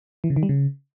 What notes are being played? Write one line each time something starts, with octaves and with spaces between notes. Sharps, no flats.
E3
C#3
D#3
G3
C#3